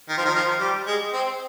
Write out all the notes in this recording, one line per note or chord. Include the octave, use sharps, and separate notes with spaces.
D#3
F3
D#3
F3
G3
G#3
C4